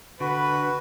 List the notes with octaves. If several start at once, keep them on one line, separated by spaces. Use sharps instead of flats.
D3 F#4 B4